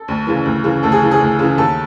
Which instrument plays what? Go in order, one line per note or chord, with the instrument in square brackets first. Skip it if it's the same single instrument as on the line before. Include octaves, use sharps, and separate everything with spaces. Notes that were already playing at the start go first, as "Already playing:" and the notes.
Already playing: [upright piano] A4
D2
C#3 E3
D2
C#3 E3
D2 A4
G#4
C#3 E3
G#4
D2
C#3 E3
D#2 A4